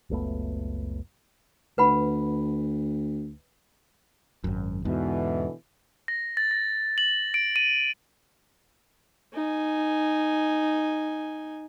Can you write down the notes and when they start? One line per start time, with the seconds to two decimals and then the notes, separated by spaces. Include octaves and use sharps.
0.10 F#1 C#2 A3 B3
1.78 D2 B4 F#5 B5
4.44 G#1 F#2
4.85 E2 G#2 B2 D3 E3
6.08 A#6
6.37 A6
6.51 A#6
6.98 F#7
7.34 D7
7.56 D#7
9.33 D#4 G#5